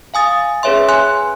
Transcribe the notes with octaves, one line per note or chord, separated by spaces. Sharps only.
F5 G#5 D#6 A6
C#4 G#4 B4 C#5 E5 C6
G#5 C6 F#6